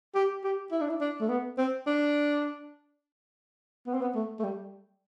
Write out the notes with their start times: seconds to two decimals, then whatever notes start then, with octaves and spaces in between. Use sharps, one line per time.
0.15 G4
0.44 G4
0.72 E4
0.81 D4
0.90 E4
1.01 D4
1.21 A3
1.29 B3
1.58 C4
1.87 D4
3.87 B3
3.94 C4
4.02 B3
4.15 A3
4.39 A3
4.44 G3